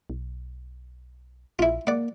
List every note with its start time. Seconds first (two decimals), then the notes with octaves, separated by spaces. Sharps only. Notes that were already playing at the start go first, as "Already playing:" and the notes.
0.10 B1
1.59 A#1 E4 F4
1.87 A#3 D5 F#5